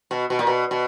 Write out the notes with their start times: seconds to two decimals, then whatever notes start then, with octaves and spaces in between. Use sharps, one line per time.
0.11 B2
0.30 B2
0.39 A#2
0.47 B2
0.71 B2